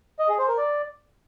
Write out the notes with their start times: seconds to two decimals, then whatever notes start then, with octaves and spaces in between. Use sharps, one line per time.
0.19 D#5
0.29 G#4
0.38 C5
0.48 A#4
0.58 D5